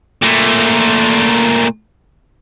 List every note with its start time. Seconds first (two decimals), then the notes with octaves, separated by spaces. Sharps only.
0.22 A#2 A3